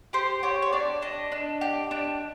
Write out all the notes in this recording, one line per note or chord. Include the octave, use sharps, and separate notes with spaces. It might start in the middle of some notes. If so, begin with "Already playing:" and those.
G4 C5
G4 C#5
C#5
D4 D5
D4 D#5
D4
G4
D4